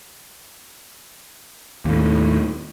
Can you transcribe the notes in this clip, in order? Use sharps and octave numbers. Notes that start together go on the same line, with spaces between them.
D#2 A2